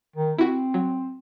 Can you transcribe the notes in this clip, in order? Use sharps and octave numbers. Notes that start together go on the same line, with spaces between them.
D#3
C4 E4 F#4
F#3